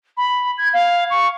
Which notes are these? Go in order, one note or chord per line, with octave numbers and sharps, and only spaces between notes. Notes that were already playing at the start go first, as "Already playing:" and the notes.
B5
G#6
F5
C#6